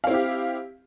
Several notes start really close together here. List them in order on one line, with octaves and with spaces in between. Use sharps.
F5 C4 E4 G4